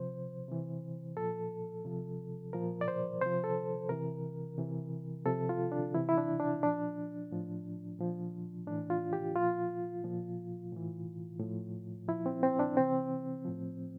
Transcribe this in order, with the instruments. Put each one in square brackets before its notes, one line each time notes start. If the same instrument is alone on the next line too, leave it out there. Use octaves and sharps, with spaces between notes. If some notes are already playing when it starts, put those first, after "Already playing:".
Already playing: [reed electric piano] C3 F3 C5
C3 E3
A#2 F3 A4
C3 F3
A#2 F3 A#4
D5
C5
C3 F3 C5
A4
C3 E3 A#4
C3 E3
C3 F3 A4
F4
D4
C3 E3 E4
E4
D4
D4
A#2 F3 D4
A2 F3
A#2 F3
A2 E3 D4
F4
G4
A#2 F3 F4
A#2 F3
A2 E3
A2 F3
A#2 F3 E4
C4
C4
D4
C3 E3 C4
A2 F3